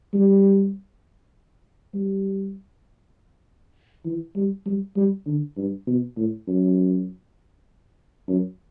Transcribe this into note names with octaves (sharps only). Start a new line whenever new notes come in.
G3
G3
E3
G3
G3
G3
D3
G2
B2
A2
F#2
F#2